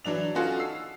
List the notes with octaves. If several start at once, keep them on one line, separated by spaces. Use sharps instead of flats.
E3 F#3 D4 F7
C#4 D#4 F4 F#4 A4
E6 C7